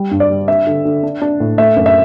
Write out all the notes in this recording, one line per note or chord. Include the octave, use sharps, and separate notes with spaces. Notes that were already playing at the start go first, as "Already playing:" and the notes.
Already playing: G3
G2
D5
G3
D4 E5
D3
D3
D4
D4
A2
A3 E5
F#2
E5